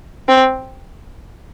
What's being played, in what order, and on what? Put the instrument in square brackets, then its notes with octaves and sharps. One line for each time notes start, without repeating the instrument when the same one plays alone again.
[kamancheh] C4